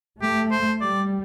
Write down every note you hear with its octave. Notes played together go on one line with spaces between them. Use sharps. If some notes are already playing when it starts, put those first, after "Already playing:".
A3 G4
C5
G3 D5